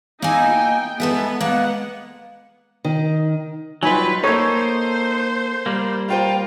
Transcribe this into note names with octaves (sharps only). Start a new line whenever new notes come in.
A#3 D#4 E4 G#5
G5
G#3 B3 A4 E5
G#3 A#3 B3 F#5
D#3
F#3 G3 D#4 F4 B4 G#5
A#3 D#4 A4 C5 C#5
G3 A#3
F4 C5 G5 A#5